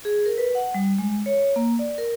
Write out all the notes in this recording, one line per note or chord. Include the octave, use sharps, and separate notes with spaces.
G#4
A#4
B4
F#5
G3
G#3
C#5
A#3
D5
A#4